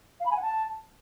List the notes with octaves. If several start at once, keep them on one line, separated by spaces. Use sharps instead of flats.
F5
B5
G#5
F#5
A5